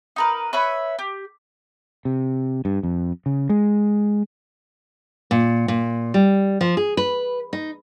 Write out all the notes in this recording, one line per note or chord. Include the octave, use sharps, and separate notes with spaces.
D#4 A#4 B4
B4 C#5 E5 B5
G4
C3
G2
F2
C#3
G#3
A#2
A#2
G3
F3
G#4
B4
D#4